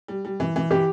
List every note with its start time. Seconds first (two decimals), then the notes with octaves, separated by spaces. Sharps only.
0.08 G3
0.25 G3
0.40 E3
0.56 E3
0.71 E3 G4